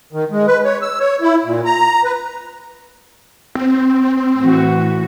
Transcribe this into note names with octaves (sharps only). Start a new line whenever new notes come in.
D#3
G#3
B4
C#5
E6
C#5
E4
A#2
A#5
B4
C4
A2 E3 F#4